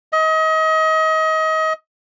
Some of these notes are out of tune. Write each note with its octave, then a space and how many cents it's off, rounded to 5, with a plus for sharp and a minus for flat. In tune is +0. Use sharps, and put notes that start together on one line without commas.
D#5 +30